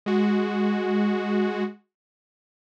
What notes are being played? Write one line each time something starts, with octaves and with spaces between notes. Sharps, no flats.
G#3 F#4